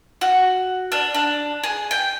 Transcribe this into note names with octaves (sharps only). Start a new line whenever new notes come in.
F#4
D4
D4
G#4
G5